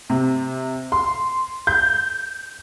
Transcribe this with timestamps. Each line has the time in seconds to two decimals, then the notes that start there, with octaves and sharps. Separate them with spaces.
0.10 C3
0.92 C6
1.67 G6